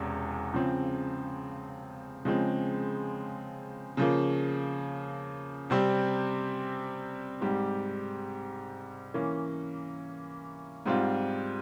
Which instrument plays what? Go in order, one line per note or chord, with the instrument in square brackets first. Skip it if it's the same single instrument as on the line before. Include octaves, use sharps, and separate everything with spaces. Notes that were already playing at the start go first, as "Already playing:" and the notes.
Already playing: [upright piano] E1 E2 C3 C#4
C#3 F3 C4
C#3 F3 G#3 C4
C#3 F3 A#3
C3 G3 C4
G#2 G3 C4 G4
E3 A#3 C#4
G#2 G3 C4 F4